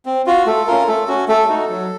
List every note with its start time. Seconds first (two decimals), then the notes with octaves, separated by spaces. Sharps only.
0.06 C4
0.26 F4 F#4
0.46 A3 A4
0.67 C#4 F4 A#4
0.88 A3 A4
1.08 C#4 F#4
1.28 A3 A4
1.49 D#4 F#4
1.70 F#3